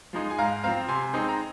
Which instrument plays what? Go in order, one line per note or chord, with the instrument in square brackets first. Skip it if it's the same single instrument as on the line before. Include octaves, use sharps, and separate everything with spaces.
[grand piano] F3 G#3 D#4
G#5
G#2 F5 A#5
F3 C4 F5 A#5
C3 G#5 C6
G#3 C4 D#4
A#5